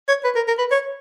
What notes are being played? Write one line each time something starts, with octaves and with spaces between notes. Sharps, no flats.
C#5
B4
A#4
A#4
B4
C#5